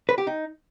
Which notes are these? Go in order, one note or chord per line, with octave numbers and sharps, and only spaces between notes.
B4
G4
D#4